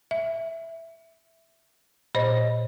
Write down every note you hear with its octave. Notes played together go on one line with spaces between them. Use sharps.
E5
A#2 C5 C#5 D#5